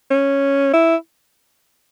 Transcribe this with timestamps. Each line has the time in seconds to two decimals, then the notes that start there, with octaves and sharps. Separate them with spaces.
0.11 C#4
0.73 E4